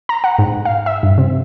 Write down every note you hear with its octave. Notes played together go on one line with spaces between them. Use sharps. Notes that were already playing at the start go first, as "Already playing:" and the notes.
A#5
F#5
G#2
F5
E5
G2
C3